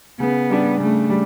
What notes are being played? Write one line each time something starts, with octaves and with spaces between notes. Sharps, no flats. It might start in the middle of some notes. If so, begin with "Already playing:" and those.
C#3 B3
G3 D4 G4
C#3 A3
G3